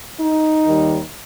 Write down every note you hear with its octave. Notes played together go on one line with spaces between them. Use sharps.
D#4
D#2 D#3 G3